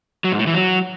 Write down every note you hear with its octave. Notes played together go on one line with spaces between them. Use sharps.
F#3
G#2
A2
E3
F#3